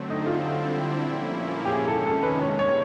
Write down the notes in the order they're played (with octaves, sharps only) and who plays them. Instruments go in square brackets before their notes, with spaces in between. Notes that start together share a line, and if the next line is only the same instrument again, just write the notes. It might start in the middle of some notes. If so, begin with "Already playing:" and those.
Already playing: [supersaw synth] D3 F#3 A3 C4
[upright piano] D#4
[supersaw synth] D3 G3 C4 E4 [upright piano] F4
[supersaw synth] A#2 F3 A#3 C#4 E4
[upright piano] G4
[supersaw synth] C3 D#3 G#3 C#4 [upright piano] G#4
[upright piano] A4
A4
B4
[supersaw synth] C3 D#3 G3 A#3 [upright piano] C#5
[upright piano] C#5